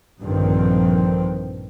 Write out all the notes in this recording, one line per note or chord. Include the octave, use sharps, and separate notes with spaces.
A#1 G2 D3 D#3 F3 C4